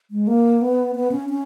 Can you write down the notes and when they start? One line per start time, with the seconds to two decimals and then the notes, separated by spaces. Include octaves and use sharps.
0.11 G#3
0.27 A#3
0.62 B3
0.95 B3
1.12 C#4
1.29 C#4